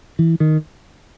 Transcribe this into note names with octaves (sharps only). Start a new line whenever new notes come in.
E3
D#3